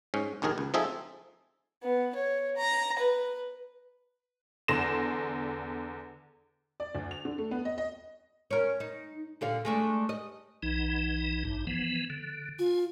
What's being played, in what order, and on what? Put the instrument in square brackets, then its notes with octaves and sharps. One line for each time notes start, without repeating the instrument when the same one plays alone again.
[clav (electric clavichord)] G#2 C#4
A#1 D#2 D#3 G#4 A#4
C#2
F3 C4 D#4 G#4 A4 E5
[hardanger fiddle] B3
C#5
A#5
B4
[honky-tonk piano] E2 D3 C6 A#6 E7
D5
D2
F7
D3
A3
B3
D#5
D#5
[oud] C#4 A#4
D#4
A#2 D3 F5
G#3 A3 D4
D#5
[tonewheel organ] B1 E3 D#4
A1 G2 D#4
E3 F3 B3
D3
[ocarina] F4 [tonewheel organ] G#5